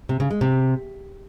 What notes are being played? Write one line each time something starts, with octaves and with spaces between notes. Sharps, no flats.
C3
C#3
G#3
C3